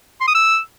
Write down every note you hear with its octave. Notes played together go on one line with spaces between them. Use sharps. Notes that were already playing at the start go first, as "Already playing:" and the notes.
C6
D#6
E6